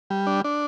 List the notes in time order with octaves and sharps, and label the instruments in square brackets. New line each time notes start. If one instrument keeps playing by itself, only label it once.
[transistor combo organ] G3
D4
D4